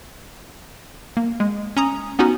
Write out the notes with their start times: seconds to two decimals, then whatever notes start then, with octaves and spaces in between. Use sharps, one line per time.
1.17 A#3
1.40 G#3
1.77 C#4 A#5 D#6
2.19 B3 C#4 D#4 F#4